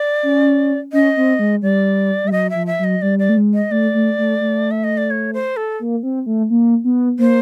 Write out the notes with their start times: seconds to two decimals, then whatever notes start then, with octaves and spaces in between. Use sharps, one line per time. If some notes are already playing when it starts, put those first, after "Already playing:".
Already playing: D5
0.23 C#4
0.93 C#4 D#5
1.17 C4
1.39 G#3
1.62 G3 D5
2.24 G3 E5
2.32 F#3 D#5
2.50 F3 E5
2.67 E5
2.79 F#3
2.84 D#5
3.02 G3 D5
3.19 D5
3.29 A3
3.37 G#3
3.54 D#5
3.71 A3 D5
3.94 A3
4.18 A3
4.40 A3
4.71 E5
4.84 D#5
4.97 D5
5.10 C#5
5.33 C5
5.57 A4
5.79 A#3
6.03 C4
6.26 A3
6.50 A#3
6.84 B3
7.19 A#3 C5